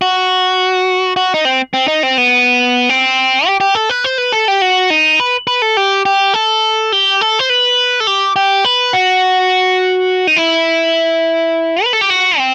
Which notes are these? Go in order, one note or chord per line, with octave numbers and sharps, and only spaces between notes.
F#4
F#4
D#4
C4
C4
D#4
C4
B3
C4
G4
G4
A4
B4
C5
B4
A4
G4
F#4
D#4
B4
B4
A4
G4
G4
A4
G4
A4
C5
B4
A4
G4
G4
B4
F#4
D#4
E4
B4
A4
G4
F#4
C4